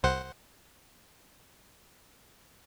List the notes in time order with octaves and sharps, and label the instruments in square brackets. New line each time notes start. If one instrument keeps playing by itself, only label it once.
[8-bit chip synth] C2 C5 F#5